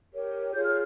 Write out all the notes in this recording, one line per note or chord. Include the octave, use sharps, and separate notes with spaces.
G4 A#4 C#5
F4 G#4 C#5 G6
F6